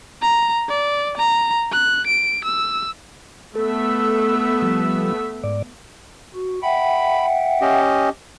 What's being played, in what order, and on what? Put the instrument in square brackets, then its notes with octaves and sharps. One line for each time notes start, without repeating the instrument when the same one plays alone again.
[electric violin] A#5
D5
A#5
F#6
D7
E6
[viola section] A3 B3 E5 [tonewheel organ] A4
[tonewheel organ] F3 G3
G#2 D5
[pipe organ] F#4
[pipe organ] E5 F#5 G5 [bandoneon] B5
[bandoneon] C#4 G4 D#5